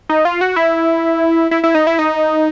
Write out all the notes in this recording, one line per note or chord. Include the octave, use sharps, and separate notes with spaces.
D#4
F4
F#4
E4
E4
E4
D#4
E4
D#4